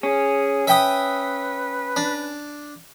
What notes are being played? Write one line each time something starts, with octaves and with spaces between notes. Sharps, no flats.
C#4 G#4
B4 E5 G5 D#6
D4